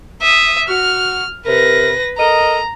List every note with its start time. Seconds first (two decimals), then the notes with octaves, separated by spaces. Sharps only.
0.22 E5 D#6
0.68 F#4 F6
1.46 C3 A#4 B4 A#6
2.18 A4 A#4 D#5 A#5